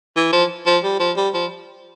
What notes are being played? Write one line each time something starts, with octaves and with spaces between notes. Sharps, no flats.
E3
F3
F3
G3
F3
G3
F3